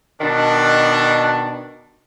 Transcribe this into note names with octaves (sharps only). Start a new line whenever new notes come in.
B2 D#3 D4